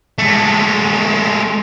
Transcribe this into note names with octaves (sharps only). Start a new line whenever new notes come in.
G#3 A3